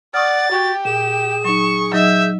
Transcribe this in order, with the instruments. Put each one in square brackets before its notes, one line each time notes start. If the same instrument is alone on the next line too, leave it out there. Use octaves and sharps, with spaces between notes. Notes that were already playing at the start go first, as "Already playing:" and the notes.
[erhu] D5 [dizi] F#5 [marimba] C#6 D#6 F6 [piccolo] A6
[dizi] F#4 [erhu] G4
[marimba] A#2 [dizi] G#4 [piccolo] E7
[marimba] F#3 D#4 [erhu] C#6
[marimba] F#3 D#4 D#5 [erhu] E5 [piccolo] G6